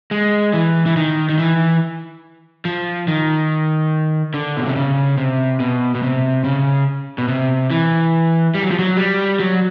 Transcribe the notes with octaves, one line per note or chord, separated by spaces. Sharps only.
G#3
E3
E3
D#3
D#3
E3
F3
D#3
D3
B2
C3
C#3
C3
B2
B2
C3
C#3
B2
C3
E3
G3
F#3
F3
F#3
G3
F#3